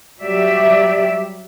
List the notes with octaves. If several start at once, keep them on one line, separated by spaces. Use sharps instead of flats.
F#3 G3 G4 D5 E5